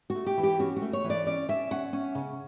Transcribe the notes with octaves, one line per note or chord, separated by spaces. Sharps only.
F#4
A3
G4
E3
G4
C#4 F#4
F#4
A3
C#5
E3
D5
C#4 D5
C#4 E5
C#4 F#5
C#4
C#3